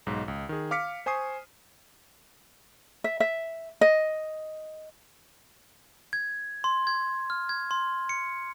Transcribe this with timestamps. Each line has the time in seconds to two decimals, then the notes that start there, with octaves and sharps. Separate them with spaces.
0.06 B1 G#2
0.28 C#2
0.49 D#3 G#4
0.71 F5 D6 F6 B6 C#7
1.06 C5 G#5 C#6 D#6 C7
3.04 E5
3.20 E5
3.81 D#5
6.13 G#6
6.64 C6
6.87 G#6
7.30 F6
7.49 G#6
7.71 C6
8.09 C#7